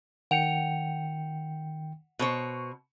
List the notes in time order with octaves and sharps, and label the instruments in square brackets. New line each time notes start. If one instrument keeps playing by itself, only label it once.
[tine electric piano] D#3 G5 C#7 [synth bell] F#5 F7
[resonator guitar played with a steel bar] B2 C5 C#5